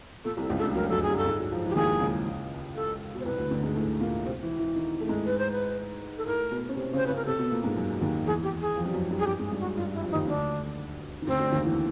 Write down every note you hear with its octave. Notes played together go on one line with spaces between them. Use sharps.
A#2 A4
C2 C3
A4
C#2 C#3
A4
D2 D3
F#2 F#3 A#4
F#2 F#3 A4
G#4
G2 G3
A4
G#2 G#3
F#3
F3
E3
G4
D#2 D#3 G#4
C#2 C#3
A4
B2
C5
C2 C3 B4
D2 D3
D2 D3
G#2 G#3
A2 A3
A#2 A#3
C3 C4
E3 E4
E3 E4
D#3 D#4
A3
G#2 G#3
B4
C5
B4
A4
A2 A3 A#4
B2 B3
C#4
C3 C4
C#3 C#4
C5
C#3 C#4 B4
A#4
C3 C4 A4
B2 B3
A#2 A#3
G#2 G#3
F#2 F#3
D#2 D#3
E2 E3 G#4
G4
G#4
F2 F3
G3
F#2 F#3
G2 G3
F#3 G#4
G2 G3 G4
G#2 G#3
G#4
G2 G3
F#4
F#2 F#3
G2 G3 F4
E4
F2 F3
D#4
D#2 D#3
D2 D3 D4
D#3
D2 D3 C4
D2 D3
D#2 D#3
E2 E3